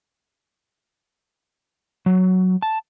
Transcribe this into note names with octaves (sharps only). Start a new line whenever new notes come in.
F#3
A5